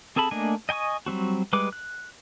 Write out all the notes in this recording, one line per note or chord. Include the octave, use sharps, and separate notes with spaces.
C4 G#4 A4 A5 B5
A3 A#3 D4 D#5 G#5
D#5 G5 G#5 C#6 D#6
F#3 G3 C4 F#4
G3 G#3 B4 D6
F#6